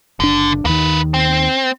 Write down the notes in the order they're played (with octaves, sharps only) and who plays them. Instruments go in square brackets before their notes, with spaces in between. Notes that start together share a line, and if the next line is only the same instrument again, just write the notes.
[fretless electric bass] F#1 D4 [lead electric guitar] D3
[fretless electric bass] D#2 D#3 [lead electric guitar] A#3 B4
[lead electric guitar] C4